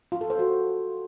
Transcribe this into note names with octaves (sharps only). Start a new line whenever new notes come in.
F4
A4
C5
F#4